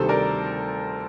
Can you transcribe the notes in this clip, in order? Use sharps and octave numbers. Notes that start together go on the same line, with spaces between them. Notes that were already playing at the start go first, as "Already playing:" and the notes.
Already playing: D2 C3 D#3 G3 A4 C5
A#4 D5